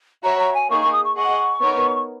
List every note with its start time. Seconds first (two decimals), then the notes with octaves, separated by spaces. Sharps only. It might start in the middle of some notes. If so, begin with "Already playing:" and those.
0.23 F#4 C#5 E5 A#5
0.39 A#5
0.54 G#5
0.70 A#3 D#4 G#4 C#6
0.81 C#6
0.92 D#6
1.04 C#6
1.15 G#4 D#5 F#5 C#6
1.61 B3 D#4 A#4 C#5